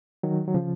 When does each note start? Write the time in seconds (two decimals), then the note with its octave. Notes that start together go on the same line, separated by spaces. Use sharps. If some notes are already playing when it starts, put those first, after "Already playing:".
0.23 D#3 F#3
0.48 F#3
0.55 C#3 F3